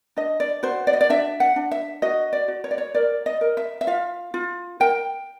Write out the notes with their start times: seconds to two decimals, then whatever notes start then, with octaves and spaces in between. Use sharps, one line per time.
0.16 D4 D#5
0.40 D5
0.63 F#4 C5
0.87 D5
0.93 D#5
1.01 D5
1.09 D4 E5
1.40 F#5
1.56 D4
1.71 E5
2.02 F#4 D#5
2.33 D5
2.48 F#4
2.64 C#5
2.71 D5
2.78 C#5
2.94 A#4 D5
3.26 D#5
3.41 A#4
3.57 E5
3.81 E5
3.87 F4 F5
4.34 F4
4.80 A#4 G5